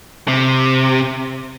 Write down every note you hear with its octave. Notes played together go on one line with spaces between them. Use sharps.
C3